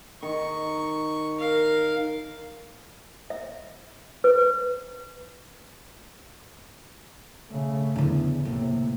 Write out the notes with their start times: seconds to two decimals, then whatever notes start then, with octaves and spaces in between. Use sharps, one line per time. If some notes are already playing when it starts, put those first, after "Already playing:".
0.23 D#3 C#6
1.38 A#4 F5
3.30 E5
4.24 B4
7.50 C#3 A3
7.96 E2 D3 E3
8.45 A2 C3 A#3 F4